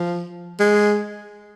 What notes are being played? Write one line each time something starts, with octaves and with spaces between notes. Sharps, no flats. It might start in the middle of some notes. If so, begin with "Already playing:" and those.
Already playing: F3
G#3